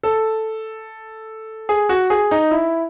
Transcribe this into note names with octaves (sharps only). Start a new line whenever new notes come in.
A4
G#4
F#4
G#4
D#4
E4